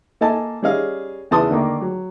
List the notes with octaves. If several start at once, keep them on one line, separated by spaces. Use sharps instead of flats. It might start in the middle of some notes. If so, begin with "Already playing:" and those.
A#3 A4 D#5 G#5 A5
G3 C#4 G#4 D#5 F5
E2 C#3 E3 A5 C6 D#6
D3 D#3 A#3
F#3